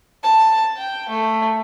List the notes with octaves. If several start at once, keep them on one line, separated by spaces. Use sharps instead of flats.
A5
G5
A3